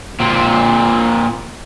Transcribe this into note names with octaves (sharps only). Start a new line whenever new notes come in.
A#2 C4